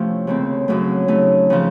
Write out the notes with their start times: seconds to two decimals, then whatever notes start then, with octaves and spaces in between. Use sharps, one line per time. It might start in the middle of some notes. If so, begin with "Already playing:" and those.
Already playing: A2 C3 F3 A3 C#4
0.27 D#2 C#3 A3 C4
0.68 F#2 C#3 F#3 A3
1.08 C#3 A3 D#4
1.50 C#3 F3